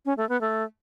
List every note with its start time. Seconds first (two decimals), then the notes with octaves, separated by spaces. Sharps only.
0.06 C#4
0.17 A3
0.29 B3
0.41 A3